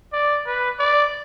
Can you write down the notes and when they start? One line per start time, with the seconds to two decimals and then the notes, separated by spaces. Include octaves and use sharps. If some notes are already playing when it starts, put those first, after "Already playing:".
0.13 D5
0.46 B4
0.79 D5